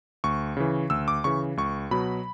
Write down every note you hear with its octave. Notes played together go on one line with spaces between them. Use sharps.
D2 C#6
C#3 E3
D2 E6
D6
C#3 E3 C#6
C#2 C#6
B2 F#3 B5